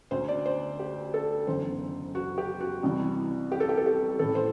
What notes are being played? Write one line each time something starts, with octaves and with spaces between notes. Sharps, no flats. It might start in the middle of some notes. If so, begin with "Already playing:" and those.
D2 D3 C5
D5
C5
G4
A4
F#1 E2 D3 C5
F#4
G4
F#4
C2 C3 E3
G4
A4
G4
A4
G4
A1 A2 E3 A4
C5